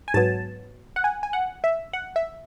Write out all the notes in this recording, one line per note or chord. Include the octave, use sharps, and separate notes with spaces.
G#5
G#2 F#3 B3 A5
F#5
G#5
G#5
F#5
E5
F#5
E5